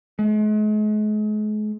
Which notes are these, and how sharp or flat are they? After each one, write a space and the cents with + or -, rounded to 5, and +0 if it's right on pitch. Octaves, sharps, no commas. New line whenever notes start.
G#3 +40